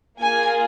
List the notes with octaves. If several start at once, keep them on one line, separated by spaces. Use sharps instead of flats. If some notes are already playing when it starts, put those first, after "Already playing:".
A#3 F4 G#4 G#5